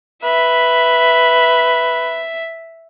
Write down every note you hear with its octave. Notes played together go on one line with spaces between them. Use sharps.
B4 E5